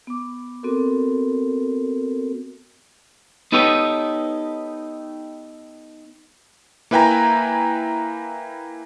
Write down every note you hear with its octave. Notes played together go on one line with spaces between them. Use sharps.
B3 D6
B3 C4 F#4 A4 A#4
B3 D#4 G4 A4 B4 C#5
A#3 E4 B4 G5 G#5 A#5